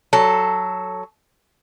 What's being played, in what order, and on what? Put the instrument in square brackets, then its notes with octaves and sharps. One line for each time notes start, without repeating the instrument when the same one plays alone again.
[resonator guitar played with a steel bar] F#3 A4